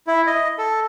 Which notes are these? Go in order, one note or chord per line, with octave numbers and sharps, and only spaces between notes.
E4
D#5
A4